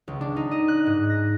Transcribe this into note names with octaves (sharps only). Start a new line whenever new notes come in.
C#2
D4
D#4
D#5
F#6
G#2
A#6